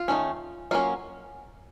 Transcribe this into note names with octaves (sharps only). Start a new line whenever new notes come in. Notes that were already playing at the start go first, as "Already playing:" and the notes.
Already playing: F4
D#3 F#3 A3 C#4
F#3 A#3 C#4 F4